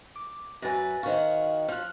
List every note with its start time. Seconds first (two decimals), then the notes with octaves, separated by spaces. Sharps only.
0.16 D6
0.62 F#2 B4 G#5 A6 A#6
1.03 D#3 F#4 C5 F5
1.68 F3 F6 F#6